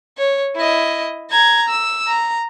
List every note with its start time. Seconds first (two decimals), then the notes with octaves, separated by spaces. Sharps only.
0.18 C#5
0.56 E4 D#5
1.31 A#5 G#6
1.69 E6
2.07 A#5